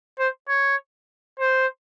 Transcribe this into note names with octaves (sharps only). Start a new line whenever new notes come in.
C5
C#5
C5